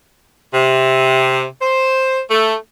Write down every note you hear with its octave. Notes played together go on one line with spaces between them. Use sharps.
C3
C5
A3